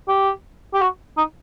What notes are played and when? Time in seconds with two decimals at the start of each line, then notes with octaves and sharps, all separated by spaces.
0.08 G4
0.74 G4
0.82 F#4
1.17 D#4